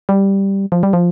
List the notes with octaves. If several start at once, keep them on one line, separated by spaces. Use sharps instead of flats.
G3
F3
G3
F3